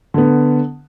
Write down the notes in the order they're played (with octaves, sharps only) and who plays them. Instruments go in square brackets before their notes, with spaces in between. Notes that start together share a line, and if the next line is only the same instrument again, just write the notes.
[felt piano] D3 B3